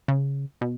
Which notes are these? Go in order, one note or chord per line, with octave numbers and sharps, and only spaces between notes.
C#3
B2